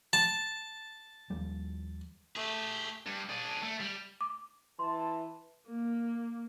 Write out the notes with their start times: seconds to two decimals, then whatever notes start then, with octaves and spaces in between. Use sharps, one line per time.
0.13 A5
1.30 D#2 F3 G3
2.36 A3 G4 G#4
3.06 G2
3.29 D4 G#4
3.63 A3
3.80 G3
4.21 D6
4.79 E3 A5 C6
5.68 A#3